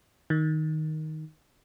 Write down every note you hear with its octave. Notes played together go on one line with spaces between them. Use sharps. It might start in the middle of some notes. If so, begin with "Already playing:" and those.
D#3